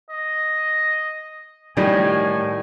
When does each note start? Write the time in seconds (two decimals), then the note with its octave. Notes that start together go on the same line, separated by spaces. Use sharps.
0.09 D#5
1.77 A2 D#3 G3 G#5